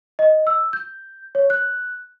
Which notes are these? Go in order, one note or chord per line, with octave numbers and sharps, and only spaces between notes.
D#5
E6
G6
C#5
F#6